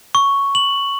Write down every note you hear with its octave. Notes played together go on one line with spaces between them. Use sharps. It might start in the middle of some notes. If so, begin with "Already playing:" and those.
C#6
F#7